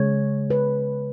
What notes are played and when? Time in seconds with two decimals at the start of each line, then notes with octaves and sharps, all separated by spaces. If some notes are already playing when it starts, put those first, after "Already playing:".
Already playing: C#3 G#3 C#5
0.50 B4